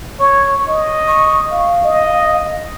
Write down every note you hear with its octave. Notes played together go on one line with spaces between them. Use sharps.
C#5 C#6
D#5
C#6
F5
D#5